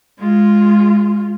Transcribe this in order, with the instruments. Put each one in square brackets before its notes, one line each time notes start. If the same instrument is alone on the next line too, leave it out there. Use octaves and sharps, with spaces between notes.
[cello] G#3 F4